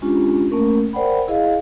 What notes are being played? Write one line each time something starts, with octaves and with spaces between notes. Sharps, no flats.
G#3 C#4 D4 F4 G4
A3 A#3 C#4 A#4
A#4 C5 D5 F#5 G5 B5
E4 G#4 D#5 F5